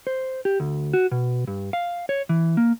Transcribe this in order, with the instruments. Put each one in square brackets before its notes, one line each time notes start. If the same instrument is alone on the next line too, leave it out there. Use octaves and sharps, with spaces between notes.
[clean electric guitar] C5
G4
D2
F#4
B2
G2
F5
C#5
E3
A#3